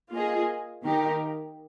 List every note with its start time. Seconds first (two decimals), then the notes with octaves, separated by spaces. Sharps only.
0.12 A#3 F4 G#4 D#5
0.84 D#3 A#3 D#4 G4 A#4